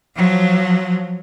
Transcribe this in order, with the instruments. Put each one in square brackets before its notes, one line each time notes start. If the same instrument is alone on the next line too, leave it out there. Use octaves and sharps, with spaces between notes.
[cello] F3 F#3